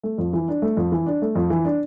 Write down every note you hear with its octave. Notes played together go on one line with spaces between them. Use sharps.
A3
F2
E3
D4
A3
F2
E3
D4
A3
F2
E3
D4